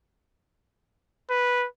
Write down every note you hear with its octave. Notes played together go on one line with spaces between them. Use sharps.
B4